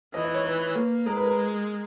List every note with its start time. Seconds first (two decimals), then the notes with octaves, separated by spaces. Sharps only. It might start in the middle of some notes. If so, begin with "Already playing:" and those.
0.14 E3 D#5
0.24 D#5
0.34 C#5
0.45 B4
0.75 A#3
1.06 G#3 A#4
1.17 B4
1.27 A#4